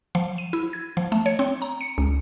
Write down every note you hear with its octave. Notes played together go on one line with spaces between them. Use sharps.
F3
D#7
E4
G#6
F3
A3
C#5
C4
A#5
C#7
C#2